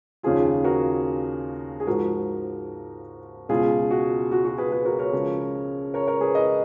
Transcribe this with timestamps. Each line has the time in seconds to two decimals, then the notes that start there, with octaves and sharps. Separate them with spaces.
0.23 D#2 C#3 F3 F4 G#4
0.64 F#4 A#4
1.80 G#4
1.87 G#2 F3 F#4 A#4
3.49 C#2 B2 F4 G#4
3.91 F#4
4.32 F#4
4.45 F#4
4.58 G#4 B4
4.72 G#4 B4
4.85 F#4 A#4
4.99 A#4 C#5
5.13 C#2 C#3 F3
5.94 A#4 C#5
6.07 A#4 C#5
6.21 G#4 B4
6.35 B4 D#5